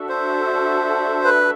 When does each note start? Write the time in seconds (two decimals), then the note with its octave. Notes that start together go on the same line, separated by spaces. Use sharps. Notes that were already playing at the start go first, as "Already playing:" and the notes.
Already playing: D4 F#4 A4 E5
0.09 C5
1.25 B4